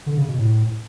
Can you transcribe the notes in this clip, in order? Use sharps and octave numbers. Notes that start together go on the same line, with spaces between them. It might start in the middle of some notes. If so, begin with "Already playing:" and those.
D3
C#3
B2
A2